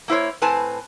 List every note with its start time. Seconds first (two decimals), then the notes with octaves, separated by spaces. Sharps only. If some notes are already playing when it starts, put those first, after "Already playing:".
0.08 A#3 E4 C5 C#5
0.42 A2 C4 B4 G#5 A5